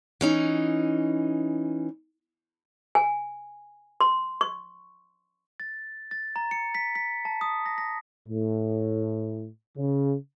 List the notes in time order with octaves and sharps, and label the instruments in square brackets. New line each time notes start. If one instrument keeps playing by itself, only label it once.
[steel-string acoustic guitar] E3 C#4 D#4
[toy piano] G#5
C6
C#6
[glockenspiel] A6
A6
A#5
C#7
B6
B6
A5
D#6
A#6
A#6
[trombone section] A2
C#3